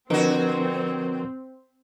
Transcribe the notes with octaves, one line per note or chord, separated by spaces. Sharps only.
D3 F3 C4 F#4 A#4 B4